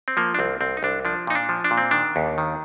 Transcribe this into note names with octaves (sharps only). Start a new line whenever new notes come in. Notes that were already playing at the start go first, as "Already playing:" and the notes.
C4
F3 A#3
D4
C2 C4
C2 C4
D#4
C2 D4
F3 D4
A#2 D#4
D4
F3
D4
A#2
C4
D#3 D4
D#2
D#3